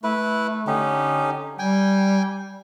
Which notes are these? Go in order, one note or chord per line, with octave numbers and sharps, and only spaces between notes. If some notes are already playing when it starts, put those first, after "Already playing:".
A3 E4 B4
D3 C#4 D#4 G4
G3 G5 G#5